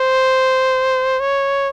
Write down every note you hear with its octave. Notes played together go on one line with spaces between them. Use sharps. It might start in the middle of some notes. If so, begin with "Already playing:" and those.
Already playing: C5
C#5